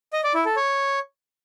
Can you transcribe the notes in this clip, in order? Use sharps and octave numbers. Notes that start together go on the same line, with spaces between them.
D#5
D5
E4
A4
C#5